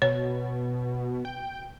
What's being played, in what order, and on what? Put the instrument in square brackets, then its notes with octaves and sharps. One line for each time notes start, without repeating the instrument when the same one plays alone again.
[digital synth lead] B2 [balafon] C#5
[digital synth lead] G5